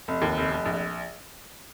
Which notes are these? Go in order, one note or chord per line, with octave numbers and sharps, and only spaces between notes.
F1
D#2
F1
F1
A#1